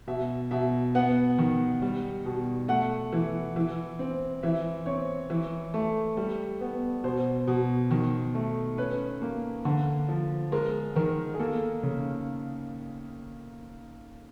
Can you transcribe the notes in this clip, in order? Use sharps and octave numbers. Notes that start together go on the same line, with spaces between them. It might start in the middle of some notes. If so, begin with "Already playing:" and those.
B2 E5
B2 E5
B3 F#5
D#3
G3
B2
A3 F#5
E3
E3
C4
E3 E5
C4 C#5
E3
A3
G3
B3
B2 C5
B2
D#3
A3
C#4 B4
A#3
D3
F3
G#3 A#4
D#3 A#4
G#4
A#3 A4
C#3